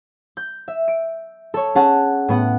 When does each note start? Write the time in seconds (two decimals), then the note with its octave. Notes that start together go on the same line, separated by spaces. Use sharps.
0.37 G6
0.68 E5
0.88 D7
1.54 A4 C#5
1.75 C#4 G#4 F#5 A5
2.28 A2 B3 F#5